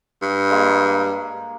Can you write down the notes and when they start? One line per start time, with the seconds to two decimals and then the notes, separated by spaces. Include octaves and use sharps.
0.22 G2
0.50 G#3 A#3